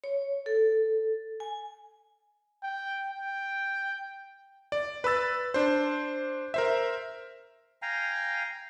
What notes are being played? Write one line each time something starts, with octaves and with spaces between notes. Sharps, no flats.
C#5
A4
G#5
G5
G5
D5
B4 B5 E6 A6
D4 C5
A#4 C5 E5
F5 G5 G#5 A#5